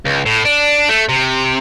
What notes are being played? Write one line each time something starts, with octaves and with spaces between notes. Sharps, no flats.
C#2
A2
D4
A3
C3